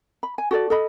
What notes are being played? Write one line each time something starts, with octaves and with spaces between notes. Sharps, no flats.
B5
G#5
F#4 A4 D5
A4 D#5 B5